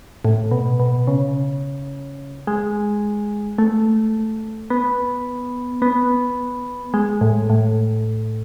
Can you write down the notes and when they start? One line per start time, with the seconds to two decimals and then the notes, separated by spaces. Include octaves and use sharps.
0.25 A2
0.51 B2
0.80 B2
1.07 C#3
2.47 G#3
3.58 A3
4.70 B3
5.82 B3
6.94 G#3
7.21 A2
7.50 A2